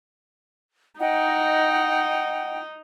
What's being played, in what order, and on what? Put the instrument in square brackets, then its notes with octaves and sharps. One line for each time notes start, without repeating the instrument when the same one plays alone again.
[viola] D#4 [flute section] D#5 F#5 G5